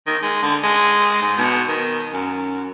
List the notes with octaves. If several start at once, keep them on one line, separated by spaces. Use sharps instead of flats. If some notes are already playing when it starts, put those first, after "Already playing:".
D#3
G#3
D3
G#3
G#2
B2
D#3
F#2